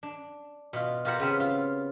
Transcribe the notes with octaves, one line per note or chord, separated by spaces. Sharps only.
D4
B2 F4
F4 G4 A#4 C5 F#5
C#3 B3 C4
F4